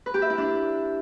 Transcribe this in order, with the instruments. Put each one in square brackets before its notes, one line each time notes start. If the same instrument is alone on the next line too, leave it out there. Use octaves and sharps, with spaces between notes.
[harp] B4
G4
E5
E4
D4